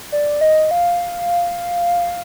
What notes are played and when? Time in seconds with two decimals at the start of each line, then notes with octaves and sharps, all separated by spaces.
0.12 D5
0.41 D#5
0.71 F5